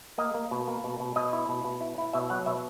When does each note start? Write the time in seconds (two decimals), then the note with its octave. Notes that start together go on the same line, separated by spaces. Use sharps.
0.18 A#3 D#5
0.34 A#3
0.51 B2
0.68 A#3
0.84 B2
1.00 B2
1.16 B2 D#5
1.33 E4
1.49 B2
1.64 B2
1.81 E4
1.98 E4
2.13 B2 E5
2.30 F#3 F#5
2.46 B2 E5